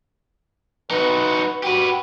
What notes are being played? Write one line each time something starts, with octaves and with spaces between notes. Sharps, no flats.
D#4 F#4 B4
F#4 G4 B4